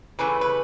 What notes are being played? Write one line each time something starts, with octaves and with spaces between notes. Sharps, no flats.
C#3 E3 A3 B4
B4